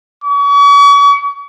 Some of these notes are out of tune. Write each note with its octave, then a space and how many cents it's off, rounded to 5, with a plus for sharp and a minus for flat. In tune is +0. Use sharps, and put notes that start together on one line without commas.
C#6 +40